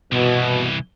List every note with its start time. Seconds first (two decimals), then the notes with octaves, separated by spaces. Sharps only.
0.12 C2 B2 E3